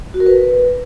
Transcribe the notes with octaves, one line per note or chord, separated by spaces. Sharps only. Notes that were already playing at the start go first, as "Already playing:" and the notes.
F#4
A#4
B4